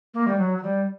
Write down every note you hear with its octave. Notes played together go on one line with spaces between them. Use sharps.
A#3
G3
F#3
F#3
G3